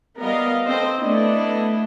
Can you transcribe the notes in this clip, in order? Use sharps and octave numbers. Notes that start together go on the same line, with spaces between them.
G3 B3 A#4 D#5 F5
C4 A4 C5 D#5
A3 B3 D4 E4 D#5